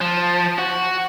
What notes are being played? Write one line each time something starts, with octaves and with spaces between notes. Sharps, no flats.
F3
F#4